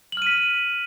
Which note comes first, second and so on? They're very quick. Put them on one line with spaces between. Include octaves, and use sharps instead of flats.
F#7 F6 D#7 B6